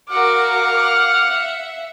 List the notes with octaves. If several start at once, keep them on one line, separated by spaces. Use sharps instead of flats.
F#4 A#4 F5 F#5 D6 F6
E5